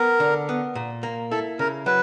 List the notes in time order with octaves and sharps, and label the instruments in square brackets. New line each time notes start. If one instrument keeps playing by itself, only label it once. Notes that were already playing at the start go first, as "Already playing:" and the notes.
Already playing: [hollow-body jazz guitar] B3 [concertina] A#4
[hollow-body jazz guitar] D3
B3
A#2
A#3
[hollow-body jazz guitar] E4 [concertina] A4
[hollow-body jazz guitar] C#3 [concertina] A#4
[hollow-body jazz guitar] F#3 [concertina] B4